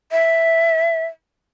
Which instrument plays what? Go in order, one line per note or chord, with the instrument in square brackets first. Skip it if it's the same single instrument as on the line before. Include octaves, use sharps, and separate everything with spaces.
[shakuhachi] E5